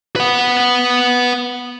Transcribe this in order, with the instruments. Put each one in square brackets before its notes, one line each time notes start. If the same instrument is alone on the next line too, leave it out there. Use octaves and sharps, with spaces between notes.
[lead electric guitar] B4 F#5